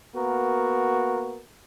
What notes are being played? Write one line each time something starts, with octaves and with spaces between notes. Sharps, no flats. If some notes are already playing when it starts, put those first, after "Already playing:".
A#3 B3 F#4 A#4